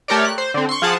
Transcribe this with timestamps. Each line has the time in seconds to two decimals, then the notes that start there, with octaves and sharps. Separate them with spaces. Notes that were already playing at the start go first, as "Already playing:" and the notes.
0.08 A3 G4 A#4 C#5 D5
0.25 F#6
0.38 C5
0.54 D3 C4
0.69 C6 C#6
0.82 F3 F4 G#4 F#5 A5